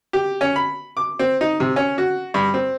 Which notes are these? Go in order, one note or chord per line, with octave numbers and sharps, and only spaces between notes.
G4
C#4
B5
D6
C4
D#4
C3
C#4
F#4
G2
C4